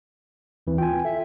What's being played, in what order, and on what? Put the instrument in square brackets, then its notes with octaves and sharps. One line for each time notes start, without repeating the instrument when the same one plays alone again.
[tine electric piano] D#2 E3 C4
[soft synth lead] F4 [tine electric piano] G5 G#5
[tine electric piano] A4 [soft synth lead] E5